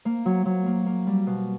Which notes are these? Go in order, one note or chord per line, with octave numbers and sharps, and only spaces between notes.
A#3
F#3
F#3
A#3
A#3
G3
B2